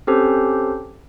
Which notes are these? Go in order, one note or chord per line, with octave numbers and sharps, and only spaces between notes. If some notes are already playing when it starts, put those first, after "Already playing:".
C4 C#4 G4 A4 C5